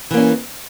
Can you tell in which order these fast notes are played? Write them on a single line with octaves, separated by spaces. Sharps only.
E3 A#3 C#4